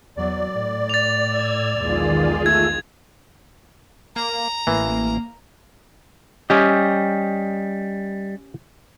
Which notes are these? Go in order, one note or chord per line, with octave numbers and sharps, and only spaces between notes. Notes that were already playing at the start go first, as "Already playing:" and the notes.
E2 F#3 D5
A2
A6 F7
E6 G#6
B1 E2 D#3 G#3 F4 G#4
A3 E6 G#6
A#3 A#5
A1 E3 A#3
G3 C#4 G4 D#5